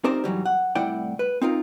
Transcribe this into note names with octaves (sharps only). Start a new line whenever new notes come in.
C4 D#4 G4 A#4 C5 D5
G#2 E3 F#3 G3
F#5
C2 A2 E4 D5 F#5 G5
B4
C4 D#4 F4 A#4